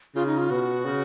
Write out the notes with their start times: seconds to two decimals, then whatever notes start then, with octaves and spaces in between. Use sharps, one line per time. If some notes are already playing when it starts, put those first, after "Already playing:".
0.15 C#3 F4
0.26 D#4
0.38 F4
0.50 B2 F#4
0.85 C#3